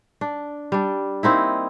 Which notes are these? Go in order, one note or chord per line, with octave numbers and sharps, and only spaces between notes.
D4
G3 D4
A#3 C4 D#4 E4